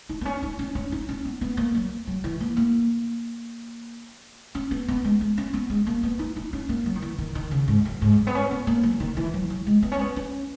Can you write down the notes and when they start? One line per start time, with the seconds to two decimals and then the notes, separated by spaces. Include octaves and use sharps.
0.09 D#4
0.21 B3
0.25 C#4
0.43 D#4
0.59 C#4
0.75 C#4
0.92 D#4
1.09 C#4
1.25 B3
1.41 B3
1.57 A#3
1.74 F#3
2.07 F#3
2.24 E3
2.40 A#3
2.57 A#3
4.55 C#4
4.71 B3
4.88 B3
5.04 G#3
5.21 G#3
5.38 C#4
5.54 B3
5.70 G#3
5.87 A#3
6.03 B3
6.19 D#4
6.36 D#4
6.53 C#4
6.69 A#3
6.86 F#3
6.95 D#3
7.02 E3
7.18 D#3
7.35 D#3
7.51 C#3
7.68 G#2
7.85 F#2
8.02 G#2
8.18 F#3
8.27 B3
8.35 C#4
8.51 B3
8.67 A#3
8.83 F#3
9.00 D#3
9.17 E3
9.34 F#3
9.50 F#3
9.67 G#3
9.82 B3
9.92 C#4
9.99 B3
10.16 C#4